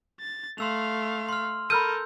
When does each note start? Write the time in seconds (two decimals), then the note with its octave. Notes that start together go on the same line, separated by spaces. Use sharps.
0.20 A6
0.58 A3 F5 C6 E6 F7
1.29 C6 F6
1.70 A4 A#4 B5 E6 F6 G6 D#7